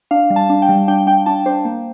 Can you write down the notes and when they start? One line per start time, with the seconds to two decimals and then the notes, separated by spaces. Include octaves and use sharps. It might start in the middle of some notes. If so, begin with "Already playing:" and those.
0.11 D4 F5
0.30 G3
0.36 A5
0.50 D4
0.62 G5
0.69 G3
0.88 D4 G5
1.07 D4 G5
1.26 D4 A5
1.46 D4 C5
1.65 A#3